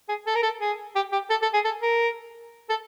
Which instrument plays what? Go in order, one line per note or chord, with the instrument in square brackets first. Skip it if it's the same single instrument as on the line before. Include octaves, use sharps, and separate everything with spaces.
[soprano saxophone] G#4
A4
A#4
A4
G#4
G4
G4
A4
A4
G#4
A4
A#4
A4